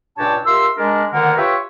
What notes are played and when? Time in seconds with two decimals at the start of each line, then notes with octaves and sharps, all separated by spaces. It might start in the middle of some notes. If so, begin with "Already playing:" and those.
0.18 C#2 A#2 D4 G4 C#5 A5
0.47 F4 G4 A#4 E5 C6 E6
0.78 G#3 D4 A#4
1.12 D2 D3 D#3 A#3 A#4 F#5
1.37 F4 G4 B4 C#5 E5 G5